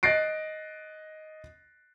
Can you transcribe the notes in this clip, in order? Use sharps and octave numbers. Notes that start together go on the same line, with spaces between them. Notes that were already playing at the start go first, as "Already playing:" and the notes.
D#5 F#6 A6 A#6 C7 D7